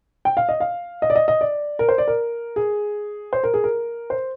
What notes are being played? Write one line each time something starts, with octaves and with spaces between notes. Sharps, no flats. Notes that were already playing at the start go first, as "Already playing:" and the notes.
G5
F5
D#5
F5
D#5
D5
D#5
D#5
D5
A#4
C5
D5
A#4
G#4
C5
A#4
G#4
A#4
C5